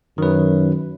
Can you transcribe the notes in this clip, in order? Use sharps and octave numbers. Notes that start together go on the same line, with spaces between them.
F#2 D#3 B4